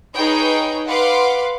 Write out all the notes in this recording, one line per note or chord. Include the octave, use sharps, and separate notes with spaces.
D#4 G#4 B4 C#5 G5
B4 F5 F#5 C6 D6